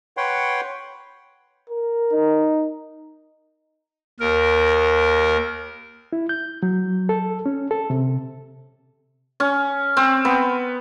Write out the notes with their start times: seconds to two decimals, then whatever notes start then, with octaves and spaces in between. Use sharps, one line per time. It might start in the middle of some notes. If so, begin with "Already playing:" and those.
0.17 B4 C#5 F#5 G5 C6
1.69 A#4
2.13 D#4
4.20 D#2 A#4
6.13 E4
6.29 G6
6.63 F#3
7.09 A4
7.46 C#4
7.71 A4
7.90 C3
9.40 C#4
9.97 C4
10.25 B3